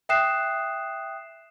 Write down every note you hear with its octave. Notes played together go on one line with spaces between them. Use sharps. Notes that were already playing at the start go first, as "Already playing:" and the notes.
E5 G5 D#6 F#6 C7 E7